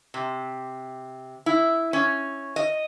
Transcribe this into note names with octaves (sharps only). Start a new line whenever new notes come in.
C3
E4
C#4
D#5